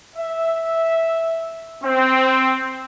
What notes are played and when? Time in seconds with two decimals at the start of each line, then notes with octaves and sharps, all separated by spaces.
0.16 E5
1.83 C4